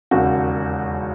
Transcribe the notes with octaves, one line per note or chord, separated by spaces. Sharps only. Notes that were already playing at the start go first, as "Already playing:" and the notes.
E1 D#2 C#3 F#4